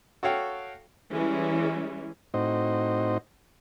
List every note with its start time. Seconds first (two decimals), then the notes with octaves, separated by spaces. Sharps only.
0.23 F#4 A4 C#5 F5 G5
1.12 E3 G3 G#3 C#4
2.34 A2 C4 D#4 F#4 C5 D#5